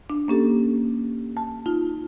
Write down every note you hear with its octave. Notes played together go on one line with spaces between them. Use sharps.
D4
A#3 C#4 G4 A4
A5
D#4 F4